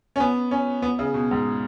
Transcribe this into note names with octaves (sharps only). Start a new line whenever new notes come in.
C#4
B3
C#4
B3
C#3
B2
G#2